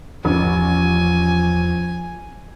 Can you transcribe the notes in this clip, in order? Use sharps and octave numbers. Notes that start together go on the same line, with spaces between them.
A1 E2 F3 G#5